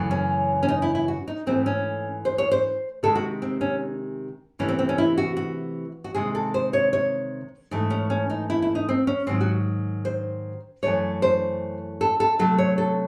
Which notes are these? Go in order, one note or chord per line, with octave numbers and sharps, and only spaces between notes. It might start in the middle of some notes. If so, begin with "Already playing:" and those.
Already playing: F#2 C#3 E3 A3
C#4
C#4
D#4
E4
E4
F#4
D#4
G#2 E3 A3 C4
C#4
C5
C#5
C5
C3 D#3 G#3 A4
F#4
C4
C#4
C3 E3 A3 C#4
C4
C4
C#4
E4
F#4
F#4
F#4
C3 D#3 G#3 G#4
A4
C5
C#5
C#5
G#2 E3 A3 D#4
C#4
C#4
D#4
E4
E4
D#4
C4
C#4
G#2 D#3 F#3 C4
F#4
C5
F#2 E3 A3 C#5
C5
A4
A4
C3 F#3 A3 A4
C#5
A4